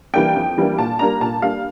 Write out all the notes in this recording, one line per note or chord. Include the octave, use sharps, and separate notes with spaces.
E3 G3 A#3 D4 G5
F2
E3 G3 A#3 D4
A#2 A5
G3 A#3 D4 A#5
A#2 A5
G3 A#3 D4 F5